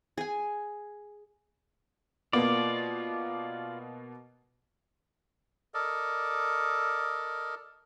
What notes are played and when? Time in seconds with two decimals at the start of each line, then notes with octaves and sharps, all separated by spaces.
0.18 G#4 G#5
2.33 B2 A#3 B3 F4 D5
5.74 A4 A#4 D5 D#5